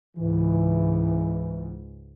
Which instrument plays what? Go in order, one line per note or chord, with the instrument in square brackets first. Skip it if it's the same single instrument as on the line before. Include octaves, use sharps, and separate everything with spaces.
[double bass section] C#2 G#2 [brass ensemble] E3